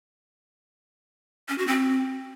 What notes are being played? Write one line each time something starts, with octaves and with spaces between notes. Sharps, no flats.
C#4
F#4
C4